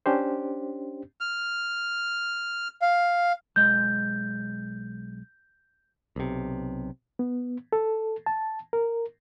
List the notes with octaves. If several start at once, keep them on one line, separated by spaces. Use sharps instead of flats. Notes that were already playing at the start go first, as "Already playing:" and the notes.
C#4 D4 G4 C5
F6
F5
B1 G#3 D#5 G6
B1 C3
B3
A4
A5
A#4